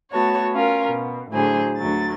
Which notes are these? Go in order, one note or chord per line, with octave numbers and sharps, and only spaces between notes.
A3 B3 F#4 C#5 A5
C#4 F4 A#4
B2
A2 D3 F#3 G#4 C5
D2 F#3 A6